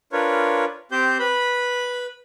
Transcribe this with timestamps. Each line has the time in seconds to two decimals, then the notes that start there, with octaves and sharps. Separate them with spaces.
0.12 D4 F4 A#4 B4 C#5
0.92 C4 G4 C5 G6
1.19 B4 B5